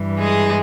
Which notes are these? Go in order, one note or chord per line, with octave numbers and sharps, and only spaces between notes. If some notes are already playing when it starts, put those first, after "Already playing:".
Already playing: G2 E3
G#3 G#4